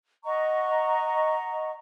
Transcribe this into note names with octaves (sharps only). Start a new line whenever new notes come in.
D#5 F#5 A#5 C#6